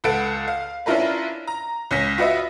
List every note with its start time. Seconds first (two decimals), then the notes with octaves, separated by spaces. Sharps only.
0.04 C#2 A4 B4 F#5 D7
0.48 F5
0.86 C#4 D4 E4 F4 A#4 B4
1.47 A#5
1.91 C#2 C#4 A#6 B6
2.18 F4 F#4 B4 D#5 E5